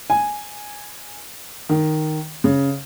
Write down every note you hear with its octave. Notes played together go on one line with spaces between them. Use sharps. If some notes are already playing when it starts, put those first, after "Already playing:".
G#5
D#3
C#3